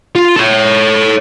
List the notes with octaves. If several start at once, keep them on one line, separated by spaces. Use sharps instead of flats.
F4
A4 C#5